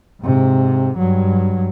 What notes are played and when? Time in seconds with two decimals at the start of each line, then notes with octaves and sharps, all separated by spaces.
0.21 G#2 C3
0.98 G2 F#3